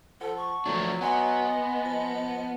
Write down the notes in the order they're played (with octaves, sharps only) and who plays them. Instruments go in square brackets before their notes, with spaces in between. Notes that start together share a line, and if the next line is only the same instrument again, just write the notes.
[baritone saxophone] F3 [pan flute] A4 [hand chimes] F#5 A5
[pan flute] C#6
[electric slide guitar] F3 A3 D4 [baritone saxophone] F#3
[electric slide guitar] B3 [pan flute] D#5 [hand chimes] F#5 G#5 C6
[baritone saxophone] F3